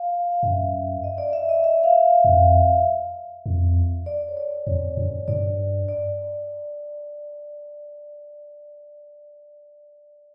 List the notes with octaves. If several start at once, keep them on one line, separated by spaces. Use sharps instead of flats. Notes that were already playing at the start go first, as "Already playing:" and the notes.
Already playing: F5
F5
F#2 E5
D#5
D5
E5
D#5
E5
F5
F2
F2
D5
C#5
D5
F2 C#5
F#2
G2 D5
D5